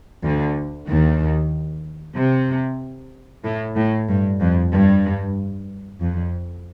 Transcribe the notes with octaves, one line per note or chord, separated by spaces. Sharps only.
D2 D3
D#2 D#3
C3
A2
A2
G2
F2
G2
F2